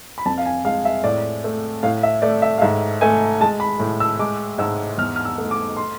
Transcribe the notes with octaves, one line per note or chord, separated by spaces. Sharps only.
B5
F2 A5
F5
G#5
G#3 F5
E5
A2 D5
A3
A2 F5
E5
A3 D5
E5
F5
G#2 E5
A3 G#5
G#3 A5
B5
A2
E6
G#3 D6
G#2 E6
E2 F6
F6
E6
A3
D6
C6